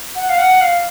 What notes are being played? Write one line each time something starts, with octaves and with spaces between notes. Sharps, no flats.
F#5
F5
F#5
F5